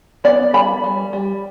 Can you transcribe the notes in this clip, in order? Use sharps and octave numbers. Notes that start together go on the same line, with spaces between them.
B3 D5
G3 B5
G3
G3